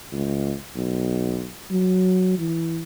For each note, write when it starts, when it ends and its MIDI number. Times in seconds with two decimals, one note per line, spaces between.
0.12 0.54 37
0.76 1.49 35
1.71 2.37 54
2.38 2.83 52